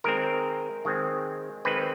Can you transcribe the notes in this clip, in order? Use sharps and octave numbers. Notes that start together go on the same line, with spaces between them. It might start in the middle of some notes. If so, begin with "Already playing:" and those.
D#3 G#3 C4 A#4
D#3 G#3 C4
D#3 G#3 C4 B4